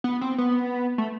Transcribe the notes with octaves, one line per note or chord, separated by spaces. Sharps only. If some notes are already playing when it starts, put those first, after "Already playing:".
B3
C4
B3
A3